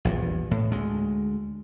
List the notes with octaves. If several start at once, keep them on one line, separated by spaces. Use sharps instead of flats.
A#1 E2 G2
A2
D2 G#3